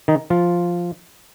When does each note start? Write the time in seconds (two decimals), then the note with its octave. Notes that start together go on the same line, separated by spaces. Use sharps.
0.08 D#3 D#4
0.30 F3 F4